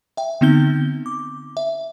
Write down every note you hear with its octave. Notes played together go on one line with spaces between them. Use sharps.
E5 G5
D3 B3 C4 D#4 G6 G7
D6
E5